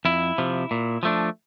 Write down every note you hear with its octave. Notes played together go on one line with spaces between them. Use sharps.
F2 E4
C3 F3
A#2
F3 A3 D4